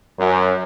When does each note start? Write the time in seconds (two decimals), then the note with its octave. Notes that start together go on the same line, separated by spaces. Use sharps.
0.19 F#2